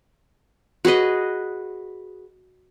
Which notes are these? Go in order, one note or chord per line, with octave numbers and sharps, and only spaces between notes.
F#4 G#4 B4 D#5